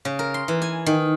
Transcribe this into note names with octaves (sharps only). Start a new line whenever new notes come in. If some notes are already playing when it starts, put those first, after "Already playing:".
C#3
A#4
C6
E3
G#5
D#3